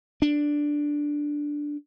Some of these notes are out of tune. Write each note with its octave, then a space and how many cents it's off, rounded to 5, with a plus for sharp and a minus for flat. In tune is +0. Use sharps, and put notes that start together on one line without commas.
D4 +0